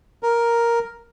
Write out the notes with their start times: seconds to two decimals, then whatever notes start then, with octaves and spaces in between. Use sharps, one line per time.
0.23 A#4